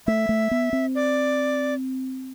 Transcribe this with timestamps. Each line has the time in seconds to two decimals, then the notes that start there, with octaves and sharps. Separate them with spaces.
0.07 A3 E5
0.29 A3
0.51 B3
0.73 C4
0.95 D5